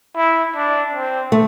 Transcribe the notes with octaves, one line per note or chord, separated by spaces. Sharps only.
E4
D4
C4
A3